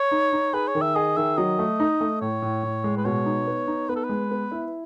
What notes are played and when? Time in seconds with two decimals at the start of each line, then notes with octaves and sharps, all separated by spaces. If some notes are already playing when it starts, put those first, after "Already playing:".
Already playing: C#5
0.11 D#4
0.33 D#4
0.53 G#4 B4
0.68 C#5
0.75 D#3
0.82 E5
0.96 G#4 D#5
1.17 D#3 E5
1.38 F#3 D#5
1.59 A3
1.80 D#4
2.01 A3
2.21 A2 C#5
2.42 A2
2.63 A2
2.84 G#3
2.97 B4
3.05 B2 C#5
3.26 D#4
3.47 B3
3.67 D#4
3.89 B3 B4
3.96 A4
4.04 B4
4.09 G#3
4.31 B3
4.52 E4